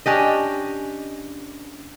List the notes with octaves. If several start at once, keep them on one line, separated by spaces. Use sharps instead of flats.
C#4 D4 G4 D#5